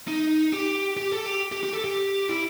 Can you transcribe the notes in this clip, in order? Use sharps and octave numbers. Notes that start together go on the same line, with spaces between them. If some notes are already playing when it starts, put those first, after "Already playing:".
D#4
G4
G4
A4
G4
G4
G4
A4
G4
E4